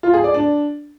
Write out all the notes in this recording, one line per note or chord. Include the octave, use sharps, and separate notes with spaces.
F4
G#4
D5
D4